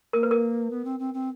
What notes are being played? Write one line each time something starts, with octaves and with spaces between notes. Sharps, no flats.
A#3 A#4
B4
A#4
B3
C4
C4
C4